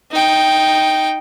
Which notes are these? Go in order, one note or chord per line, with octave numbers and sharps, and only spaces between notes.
D#4 G5